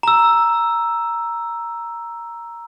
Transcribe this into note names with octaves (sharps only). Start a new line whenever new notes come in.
A#5 E6